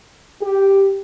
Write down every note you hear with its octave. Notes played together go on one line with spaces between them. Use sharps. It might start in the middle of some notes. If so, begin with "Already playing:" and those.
G4